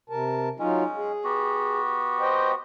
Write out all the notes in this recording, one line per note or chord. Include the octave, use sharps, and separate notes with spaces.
C3 A#4 A5
F#3 G#3 C#4 D#4 F4
G#4
B3 F#4 G4
C5 D#5 G5